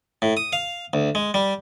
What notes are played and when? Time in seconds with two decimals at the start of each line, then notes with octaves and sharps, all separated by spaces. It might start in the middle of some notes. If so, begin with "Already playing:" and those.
0.22 A2
0.37 D#6
0.53 F5
0.93 D2
1.15 G#3
1.34 G3